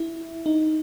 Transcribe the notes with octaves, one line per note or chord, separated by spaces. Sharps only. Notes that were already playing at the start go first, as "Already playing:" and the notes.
Already playing: E4
D#4